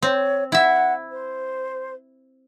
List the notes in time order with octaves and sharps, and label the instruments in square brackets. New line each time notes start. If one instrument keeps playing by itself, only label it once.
[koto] C4 [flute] C#5
[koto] E4 E5 [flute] F#5
[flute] C5